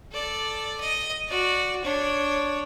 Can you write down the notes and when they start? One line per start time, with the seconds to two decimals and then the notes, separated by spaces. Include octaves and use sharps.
0.11 A4 D5
0.80 D#5
1.28 F#4 D5
1.84 D4 C#5